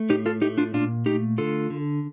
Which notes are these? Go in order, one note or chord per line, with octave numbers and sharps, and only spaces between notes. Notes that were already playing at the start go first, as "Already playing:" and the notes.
Already playing: A3
A2 D#4 G4
F4 A4
A3 D#4 G4
D4 F4
A#2 D4 F4
A3 D#4 G4
D3 F4 A4
D3